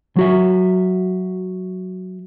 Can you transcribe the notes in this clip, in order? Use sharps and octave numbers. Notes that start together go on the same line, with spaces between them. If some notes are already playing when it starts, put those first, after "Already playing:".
F#3 F#4 E5